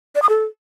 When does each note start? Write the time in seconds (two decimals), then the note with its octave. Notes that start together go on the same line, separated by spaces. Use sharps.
0.15 D5
0.22 D#6
0.29 A4